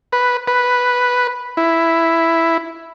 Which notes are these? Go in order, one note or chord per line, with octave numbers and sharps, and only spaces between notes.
B4
B4
E4